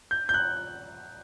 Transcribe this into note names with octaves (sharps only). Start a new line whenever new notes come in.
G6
G6
F#6